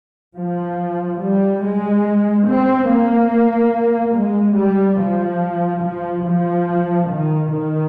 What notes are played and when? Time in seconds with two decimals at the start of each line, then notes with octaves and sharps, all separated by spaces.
0.38 F3
1.21 G3
1.63 G#3
2.47 C4
2.90 A#3
4.15 G#3
4.57 G3
4.99 F3
5.82 F3
6.25 F3
7.08 D#3
7.50 D#3